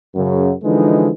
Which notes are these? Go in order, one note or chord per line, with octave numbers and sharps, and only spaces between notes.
F#2 C#3
D3 E3 F3 G#3 D#4